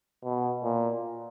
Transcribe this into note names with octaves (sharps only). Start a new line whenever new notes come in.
B2
A#2